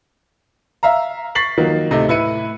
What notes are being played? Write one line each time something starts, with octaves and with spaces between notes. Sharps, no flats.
E5 F5 A#5
C#6 A6 B6 C7 F#7
D#3 F3 F#3 A#3 D#4
D1 C3 A3 D#4 D#5
A2 E4 B4 C#7 D#7